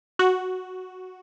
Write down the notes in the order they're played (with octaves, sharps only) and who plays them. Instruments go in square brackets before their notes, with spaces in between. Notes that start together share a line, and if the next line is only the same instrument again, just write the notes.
[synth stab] F#4